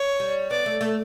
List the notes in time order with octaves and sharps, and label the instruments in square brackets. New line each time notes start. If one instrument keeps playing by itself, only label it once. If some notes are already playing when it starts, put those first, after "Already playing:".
Already playing: [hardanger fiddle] C#5
[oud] G3
[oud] B3 [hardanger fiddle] D5
[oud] A3
A3